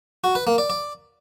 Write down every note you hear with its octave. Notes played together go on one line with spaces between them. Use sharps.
F#4
B4
A#3
D5
D5